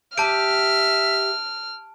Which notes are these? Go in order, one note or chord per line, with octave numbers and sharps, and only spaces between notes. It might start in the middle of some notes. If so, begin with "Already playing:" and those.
G4 E5 A5 F6 D7